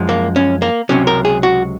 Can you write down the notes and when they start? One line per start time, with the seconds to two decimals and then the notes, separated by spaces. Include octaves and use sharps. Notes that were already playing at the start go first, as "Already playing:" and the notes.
Already playing: F#2 F3 G#3
0.09 A#3
0.36 C#4
0.62 A#3
0.89 C#2 C3 F#3 C#4
1.07 A#4
1.25 G#4
1.43 F#4